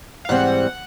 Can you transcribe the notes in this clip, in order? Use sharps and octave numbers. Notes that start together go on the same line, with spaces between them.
F5
G#2 E3 G3 C4 F#5